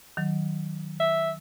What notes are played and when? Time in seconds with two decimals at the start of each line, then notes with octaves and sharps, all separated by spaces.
0.17 D#3 F#3
1.00 E5